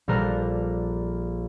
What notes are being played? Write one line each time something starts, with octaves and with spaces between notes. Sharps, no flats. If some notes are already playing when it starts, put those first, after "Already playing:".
A#1 G3 A4 A#4 A#5 F#6